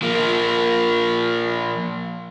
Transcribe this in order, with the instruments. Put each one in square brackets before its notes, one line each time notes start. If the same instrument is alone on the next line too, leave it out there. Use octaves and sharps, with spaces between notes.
[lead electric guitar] F3 A#3